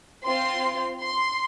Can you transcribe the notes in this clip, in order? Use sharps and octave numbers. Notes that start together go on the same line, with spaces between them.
C4 F4 C6
C6